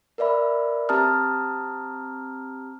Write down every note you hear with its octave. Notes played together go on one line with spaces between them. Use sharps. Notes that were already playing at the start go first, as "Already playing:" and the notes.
A#4 B4 D5 E5 B5
C4 G4 A5 A#5 D#6 F6